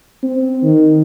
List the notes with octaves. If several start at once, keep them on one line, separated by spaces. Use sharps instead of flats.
C4
D#3